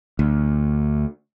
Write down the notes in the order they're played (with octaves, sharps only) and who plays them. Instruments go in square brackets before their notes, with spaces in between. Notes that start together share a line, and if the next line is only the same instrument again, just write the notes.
[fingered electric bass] D2